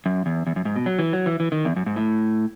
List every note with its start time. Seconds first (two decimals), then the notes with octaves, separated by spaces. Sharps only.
0.06 F#2
0.26 E2
0.47 E2
0.56 F#2
0.65 G#2
0.76 B2
0.86 F#3
0.99 E3
1.13 F#3
1.26 E3
1.40 E3
1.52 D#3
1.65 E2
1.76 F#2
1.86 G#2
1.96 A2